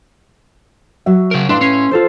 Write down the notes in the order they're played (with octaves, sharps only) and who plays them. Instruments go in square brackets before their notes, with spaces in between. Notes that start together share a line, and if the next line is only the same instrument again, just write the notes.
[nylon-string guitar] F#3 F#4 E5
[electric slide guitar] C#3 A#4
[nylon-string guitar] A2 F5 [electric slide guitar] D4 [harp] B4 E5 C6
[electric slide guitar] C#4 [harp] C7
[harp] F4 A4 C5